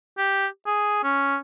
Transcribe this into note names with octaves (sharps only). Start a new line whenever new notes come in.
G4
G#4
C#4